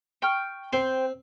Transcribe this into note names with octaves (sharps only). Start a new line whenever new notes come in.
G5 C#6 F6
C4 C5 G5